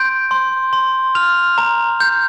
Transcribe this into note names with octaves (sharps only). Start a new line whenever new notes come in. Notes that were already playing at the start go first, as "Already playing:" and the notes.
Already playing: C6 G6 D7
C6
C6
F6 F7
A#5
G6